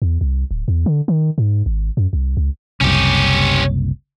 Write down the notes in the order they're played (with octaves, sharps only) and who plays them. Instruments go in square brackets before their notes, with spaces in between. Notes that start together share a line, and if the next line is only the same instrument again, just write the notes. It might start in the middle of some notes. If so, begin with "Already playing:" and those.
[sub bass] E2
C2
D1
E2
D3
D#3
G#2
G#1
F#2
C2
C#2
[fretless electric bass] F#1 C2 [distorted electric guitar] C#4 G4